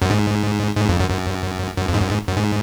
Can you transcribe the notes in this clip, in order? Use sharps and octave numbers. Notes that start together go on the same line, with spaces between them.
F#2
G#2
G#2
F2
F#2
F#2
F#2
F2
G#2
F#2
G#2
F#2
G#2